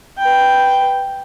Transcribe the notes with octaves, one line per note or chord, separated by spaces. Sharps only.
B4 G5